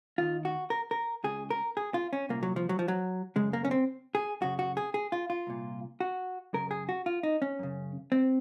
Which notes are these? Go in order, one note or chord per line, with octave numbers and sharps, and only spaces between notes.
D#2 D#3 F4
F#4
A#4
A#4
C#2 C#3 G#4
A#4
G#4
F4
C#4
C2 A#2 A#3
F#3
F3
F#3
F3
F#3
F#2 C#3 G#3
A#3
C#4
C4
G#4
F#2 C#3 F#4
F#4
G#4
G#4
F4
F4
C2 A#2
F#4
F#2 C#3 A#4
G#4
F#4
F4
D#4
C#4
F#2 C#3
C4